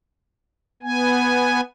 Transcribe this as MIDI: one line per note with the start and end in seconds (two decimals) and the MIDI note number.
0.83 1.61 59
0.83 1.61 80